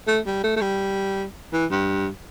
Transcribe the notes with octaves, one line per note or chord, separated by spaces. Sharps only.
A3
G3
A3
A3
G3
E3
G2